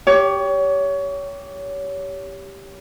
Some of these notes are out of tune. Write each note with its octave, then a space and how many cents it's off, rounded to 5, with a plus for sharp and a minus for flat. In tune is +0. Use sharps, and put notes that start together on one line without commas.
G4 +0 C#5 +25